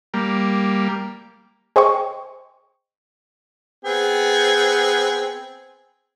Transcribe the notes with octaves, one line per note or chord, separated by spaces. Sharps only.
G3 A#3
G#4 C5 D#5 G5 C#6
B3 C4 G#4